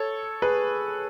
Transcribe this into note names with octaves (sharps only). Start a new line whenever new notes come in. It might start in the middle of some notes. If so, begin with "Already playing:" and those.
Already playing: A4 C#5
G#4 B4